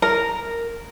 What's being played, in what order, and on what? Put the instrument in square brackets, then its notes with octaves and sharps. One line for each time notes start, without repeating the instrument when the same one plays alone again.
[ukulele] A#4